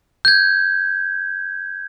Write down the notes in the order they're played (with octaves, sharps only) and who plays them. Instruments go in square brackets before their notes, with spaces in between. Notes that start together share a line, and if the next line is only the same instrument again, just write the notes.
[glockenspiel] G6 G#6